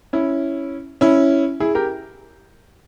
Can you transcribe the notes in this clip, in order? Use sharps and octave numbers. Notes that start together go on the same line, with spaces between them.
C#4 E4
C#4 E4
E4 G#4
G4 A#4